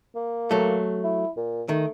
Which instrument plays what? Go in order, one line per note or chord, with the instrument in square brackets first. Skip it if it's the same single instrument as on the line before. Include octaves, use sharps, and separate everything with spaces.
[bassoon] A#3
[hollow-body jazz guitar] F#3 A3
[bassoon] E4
A#2
[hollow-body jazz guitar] D#3 [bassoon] A3